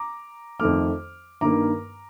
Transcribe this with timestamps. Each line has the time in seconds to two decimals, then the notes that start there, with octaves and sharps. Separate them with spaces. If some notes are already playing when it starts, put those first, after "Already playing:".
Already playing: A#5 D6
0.60 F2 D#3 A3 D6 F6
1.41 G2 D#3 A#3 A#5 D6